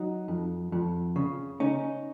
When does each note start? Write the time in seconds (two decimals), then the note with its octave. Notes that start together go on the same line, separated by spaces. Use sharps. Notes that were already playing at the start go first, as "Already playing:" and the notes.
Already playing: F#3 D#4
0.28 F2
0.72 F2
1.16 C#3
1.60 C#4 D#4